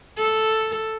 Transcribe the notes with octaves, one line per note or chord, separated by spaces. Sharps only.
A4